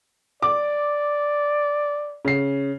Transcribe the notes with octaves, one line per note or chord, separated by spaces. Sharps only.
D5 D6
C#3 C7